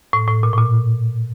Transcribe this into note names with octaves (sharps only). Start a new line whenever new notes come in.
A2
A2
A#2
A2
A#2